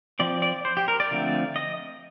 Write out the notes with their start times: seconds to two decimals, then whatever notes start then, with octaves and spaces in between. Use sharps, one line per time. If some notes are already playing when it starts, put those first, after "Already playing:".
0.19 F3 C4 D5
0.42 D5
0.65 C5
0.77 G4
0.88 A#4
1.00 D5
1.11 D3 F3 A3 C4
1.56 D#5